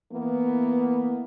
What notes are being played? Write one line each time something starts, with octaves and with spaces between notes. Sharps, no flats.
E3 A#3 B3